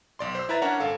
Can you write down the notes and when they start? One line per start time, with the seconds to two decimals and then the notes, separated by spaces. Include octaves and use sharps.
0.19 B1 D5 C6
0.35 C5 E6
0.49 E4 B4 E5 A#5 A6
0.62 C#4 D4 A#4 C#5 F#5 A#5
0.80 G#1 A4 F5